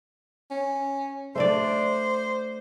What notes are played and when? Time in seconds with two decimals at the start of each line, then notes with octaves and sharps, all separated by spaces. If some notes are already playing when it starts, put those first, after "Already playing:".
0.50 C#4
1.35 A3 D4 C5 D5